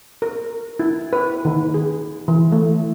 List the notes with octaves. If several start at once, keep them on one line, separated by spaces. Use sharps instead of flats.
A#4
E4
B4
D#3
G#4
E3
A3